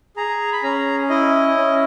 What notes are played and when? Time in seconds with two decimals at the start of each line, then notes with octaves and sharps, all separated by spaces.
0.16 G#4 A#5
0.52 B5
0.63 C#4 A#5
1.10 E4 D#5
1.57 C#4